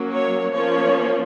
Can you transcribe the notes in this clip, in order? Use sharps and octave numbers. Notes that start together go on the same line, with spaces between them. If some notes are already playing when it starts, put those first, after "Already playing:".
Already playing: F#3 A#3 C#4
C#5
F3 A#3 C#4 C#5